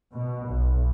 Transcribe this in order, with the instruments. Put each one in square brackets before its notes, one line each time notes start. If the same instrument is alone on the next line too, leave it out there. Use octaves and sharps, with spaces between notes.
[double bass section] B2
B1